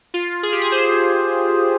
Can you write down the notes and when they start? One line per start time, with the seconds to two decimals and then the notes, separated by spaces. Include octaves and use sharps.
0.14 F4
0.43 G#4
0.52 G4
0.62 G#4
0.72 C5